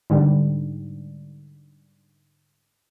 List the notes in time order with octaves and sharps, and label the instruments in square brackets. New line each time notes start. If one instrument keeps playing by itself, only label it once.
[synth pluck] G#2 D3 G3